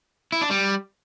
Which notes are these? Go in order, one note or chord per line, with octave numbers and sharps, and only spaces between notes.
E4
D4
G3